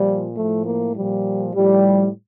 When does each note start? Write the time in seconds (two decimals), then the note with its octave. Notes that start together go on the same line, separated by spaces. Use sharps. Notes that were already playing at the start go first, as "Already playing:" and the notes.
Already playing: A#2 F3 G3
0.34 A2 F3 A3
0.64 A#3
0.94 A#2 F3 G3
1.53 A2 F3 G3